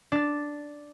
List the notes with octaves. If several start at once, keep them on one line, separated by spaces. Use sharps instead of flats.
D4 A6